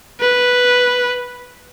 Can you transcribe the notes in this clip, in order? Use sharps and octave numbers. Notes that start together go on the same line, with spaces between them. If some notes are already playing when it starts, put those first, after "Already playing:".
B4